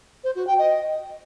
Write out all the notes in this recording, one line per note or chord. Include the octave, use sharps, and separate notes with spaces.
C5
F#4
G5
D#5